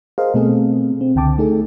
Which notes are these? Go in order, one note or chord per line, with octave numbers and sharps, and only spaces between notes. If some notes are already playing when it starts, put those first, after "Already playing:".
G#4 A#4 C5 D#5 F5
B2 A3 B3 C4 G#4 A4
C4
C#2 D3 G5 A5 D6
A3 D#4 G#4 A4